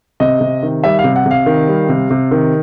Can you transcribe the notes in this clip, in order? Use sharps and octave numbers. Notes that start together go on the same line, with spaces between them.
C3 D#5
C3
D#3
G3 E5
F5
C3
F#5
C3
F5
D#3
G3
C3
C3
D#3